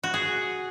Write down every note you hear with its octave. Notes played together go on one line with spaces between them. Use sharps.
F#4
G#4